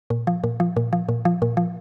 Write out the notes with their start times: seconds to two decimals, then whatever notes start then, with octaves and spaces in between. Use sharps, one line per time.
0.10 A#2
0.27 F3
0.44 A#2
0.60 F3
0.77 A#2
0.93 F3
1.09 A#2
1.25 F3
1.42 A#2
1.57 F3